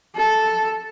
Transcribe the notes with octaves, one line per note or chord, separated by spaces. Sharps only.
A4